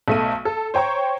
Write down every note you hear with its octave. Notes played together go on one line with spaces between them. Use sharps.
B1 A3 D#7
A4
C5 C#5 G5 A#5 C#6